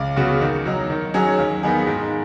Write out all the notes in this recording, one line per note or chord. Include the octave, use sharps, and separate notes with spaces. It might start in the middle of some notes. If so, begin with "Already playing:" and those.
Already playing: C#2
C#3 B3 F#4
D#3
F#3 D#4
D#3
F#3 C#4 G#4
D#2
D#3 B3 D#4 G#4
G#2